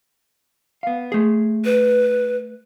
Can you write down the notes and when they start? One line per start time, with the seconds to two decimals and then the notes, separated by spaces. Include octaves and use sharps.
0.83 B3 F5
1.12 A3 G#4
1.65 B4